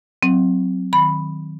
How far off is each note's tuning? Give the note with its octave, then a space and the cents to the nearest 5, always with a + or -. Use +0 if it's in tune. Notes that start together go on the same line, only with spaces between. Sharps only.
F#3 +0 C4 +0
D#3 +0 B5 +0